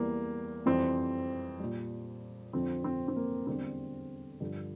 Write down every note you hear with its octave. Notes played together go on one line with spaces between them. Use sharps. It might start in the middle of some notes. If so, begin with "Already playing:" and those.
Already playing: E2 E3 G3 A#3
F2 E3 G3 C4
A#2 G3
F2 D3 F3 C4
C4
C4
A#3
E2 D3 G3 C4
G2 D3 F3